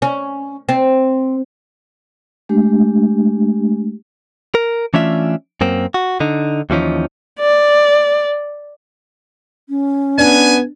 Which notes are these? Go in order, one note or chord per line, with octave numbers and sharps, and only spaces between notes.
C#4
C4
G#3 A3 D4 G4
A#4
E3 A3 C#4 D4 F4 E5
F#2 A#3 C4
F#4
D3 D#4
D#2 E3 F3 C#4 D#4
D5
C#4
B3 D4 G#5